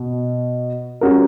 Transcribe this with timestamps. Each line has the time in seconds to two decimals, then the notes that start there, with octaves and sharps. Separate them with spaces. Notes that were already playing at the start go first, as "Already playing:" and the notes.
Already playing: B2
1.01 G3 C#4 F#4 A#4